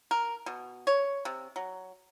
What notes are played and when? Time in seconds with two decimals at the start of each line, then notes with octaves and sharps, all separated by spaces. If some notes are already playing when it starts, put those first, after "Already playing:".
0.11 A#4
0.46 B2
0.87 C#5
1.25 C3
1.56 F#3